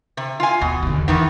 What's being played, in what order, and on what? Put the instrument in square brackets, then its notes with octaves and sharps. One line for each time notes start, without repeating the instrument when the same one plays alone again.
[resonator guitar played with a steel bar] C3
F4 G#5
[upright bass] D#2 [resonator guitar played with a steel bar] B2
[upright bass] D#2 D3
[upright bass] E2 [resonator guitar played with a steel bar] D#3 E3 B3